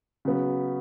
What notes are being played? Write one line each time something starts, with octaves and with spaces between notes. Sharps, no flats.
C#3 F#3 B3 F#4